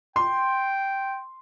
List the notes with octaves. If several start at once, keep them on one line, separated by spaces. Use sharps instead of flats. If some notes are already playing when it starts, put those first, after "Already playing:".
G5 C6